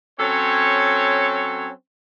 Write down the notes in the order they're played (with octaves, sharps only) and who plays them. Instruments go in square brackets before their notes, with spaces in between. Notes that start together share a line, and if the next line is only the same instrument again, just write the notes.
[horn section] F#3 C4 C#4 A4 C#5